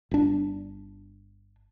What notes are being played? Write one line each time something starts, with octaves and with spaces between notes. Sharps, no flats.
G1 D4